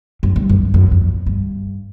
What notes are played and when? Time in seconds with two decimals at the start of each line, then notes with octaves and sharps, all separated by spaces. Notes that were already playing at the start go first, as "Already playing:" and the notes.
0.23 F#2
0.36 G2
0.49 F#2
0.74 F#2
0.91 F2
1.26 G2